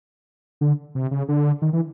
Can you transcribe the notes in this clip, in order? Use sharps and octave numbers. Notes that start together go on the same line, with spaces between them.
D3
C3
C#3
D3
D#3
E3